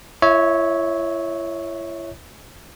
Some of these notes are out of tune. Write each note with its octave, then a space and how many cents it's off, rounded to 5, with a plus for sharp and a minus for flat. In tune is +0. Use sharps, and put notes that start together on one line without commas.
E4 +40 C#5 +0 E5 -25